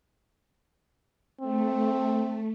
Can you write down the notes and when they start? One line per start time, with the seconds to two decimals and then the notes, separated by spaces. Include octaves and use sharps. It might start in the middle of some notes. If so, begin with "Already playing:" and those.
1.40 A3 C4